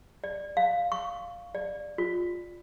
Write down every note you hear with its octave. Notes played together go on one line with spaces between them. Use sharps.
D5
F5
C#6
D5
F4